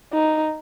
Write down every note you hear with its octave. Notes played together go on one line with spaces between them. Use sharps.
D#4